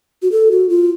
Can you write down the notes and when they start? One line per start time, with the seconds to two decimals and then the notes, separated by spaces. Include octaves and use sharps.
0.22 F#4
0.32 A4
0.51 F#4
0.69 F4